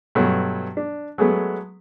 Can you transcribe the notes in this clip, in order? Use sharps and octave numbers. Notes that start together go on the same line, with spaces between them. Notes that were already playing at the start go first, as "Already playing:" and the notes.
G2 B2 F#3 A3
D4
F#3 G#3 A3 B3